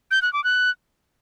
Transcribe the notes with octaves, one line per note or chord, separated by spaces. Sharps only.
G6
F#6
D6
F#6